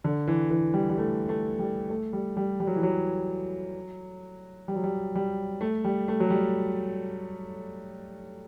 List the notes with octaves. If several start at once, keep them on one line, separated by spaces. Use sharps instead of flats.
D3
E3
E3
G3
G3
A3
A3
G3
A3
G3
G3
G3
F#3
E3
F#3
G3
F#3
G3
G3
A3
G3
A3
F#3
G3